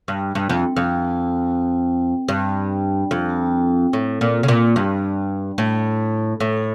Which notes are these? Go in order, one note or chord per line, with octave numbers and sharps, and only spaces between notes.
G2
G2
F2
F2
G2
F2
A2
A#2
C#3
A#2
G2
A2
A2